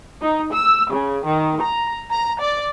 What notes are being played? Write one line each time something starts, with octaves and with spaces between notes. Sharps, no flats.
D#4
E6
C#3
D#3
A#5
A#5
D5